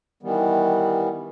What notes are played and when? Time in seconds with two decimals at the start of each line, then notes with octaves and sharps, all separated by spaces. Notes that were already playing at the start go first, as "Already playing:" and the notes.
0.23 D#3 E3 G3 B3